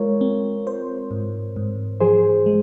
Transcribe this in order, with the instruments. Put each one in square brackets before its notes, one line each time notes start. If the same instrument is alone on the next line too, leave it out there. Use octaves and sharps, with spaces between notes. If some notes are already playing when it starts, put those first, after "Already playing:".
Already playing: [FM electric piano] G#3 F4 [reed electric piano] A#4 C#5
[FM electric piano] C4
C5
G#2
G#2
[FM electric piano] F3 [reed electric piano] G#4 C5
[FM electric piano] G#3